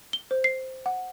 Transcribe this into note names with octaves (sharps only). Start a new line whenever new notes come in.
G7
C5
C7
F#5